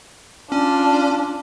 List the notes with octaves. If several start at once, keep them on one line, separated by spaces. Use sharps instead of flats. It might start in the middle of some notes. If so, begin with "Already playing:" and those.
C#4 D4 F4